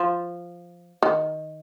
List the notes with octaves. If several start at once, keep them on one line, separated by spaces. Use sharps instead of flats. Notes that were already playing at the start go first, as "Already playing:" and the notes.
Already playing: F3
D#3